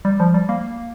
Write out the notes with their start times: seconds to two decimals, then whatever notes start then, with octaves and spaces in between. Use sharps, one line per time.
0.05 G3
0.20 F3
0.34 G3
0.49 A#3